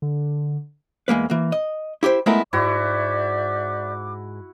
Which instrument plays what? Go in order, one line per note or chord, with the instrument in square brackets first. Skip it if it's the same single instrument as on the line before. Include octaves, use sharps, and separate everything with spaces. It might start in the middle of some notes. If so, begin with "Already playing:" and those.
[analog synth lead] D3
[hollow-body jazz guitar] E2 G#3 A#3 B4
E3 A#3
D#5
E4 G4 G#4 C5
G#3 A3 B3 E4 F4 A#4
[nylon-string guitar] G#2 [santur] E4 F#4 [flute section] D5 E5 G6 [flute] D6